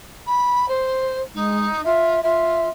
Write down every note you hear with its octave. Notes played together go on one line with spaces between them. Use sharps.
B5
C5
G#3 D#4
F4 E5
F4 E5